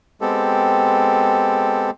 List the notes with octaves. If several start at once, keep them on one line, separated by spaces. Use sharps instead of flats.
G#3 B3 C4 G4 A4